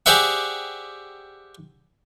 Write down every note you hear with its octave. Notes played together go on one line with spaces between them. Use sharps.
G4 G#4 C5 D5 E5 F#5